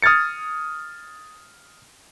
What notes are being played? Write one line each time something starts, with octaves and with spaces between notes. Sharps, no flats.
D#6 F6 G#6 A6 C#7